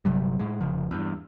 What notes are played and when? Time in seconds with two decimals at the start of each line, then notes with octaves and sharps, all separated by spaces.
0.05 G1 C3 F#3 G3
0.39 A2 G#3
0.61 F1 C#3 F3
0.91 E2 G2